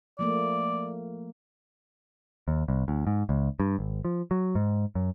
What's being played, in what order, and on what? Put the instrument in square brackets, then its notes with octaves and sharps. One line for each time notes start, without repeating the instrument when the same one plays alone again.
[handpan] F3 A3 A#3 [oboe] D5
[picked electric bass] D#2
C2
D2
G#2
C#2
G2
G#1
F3
F#3
G#2
F#2